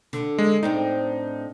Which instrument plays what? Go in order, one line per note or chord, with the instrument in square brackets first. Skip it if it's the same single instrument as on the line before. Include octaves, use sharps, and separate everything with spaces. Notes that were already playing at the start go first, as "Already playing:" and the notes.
[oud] D3
[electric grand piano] G#3
[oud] A2 C4 D4 [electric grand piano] D#4